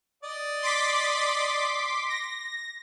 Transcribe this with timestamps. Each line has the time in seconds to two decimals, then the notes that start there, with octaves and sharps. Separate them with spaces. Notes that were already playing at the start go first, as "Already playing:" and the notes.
0.23 D5 D#5
0.62 C6 D6 B6
2.09 A#6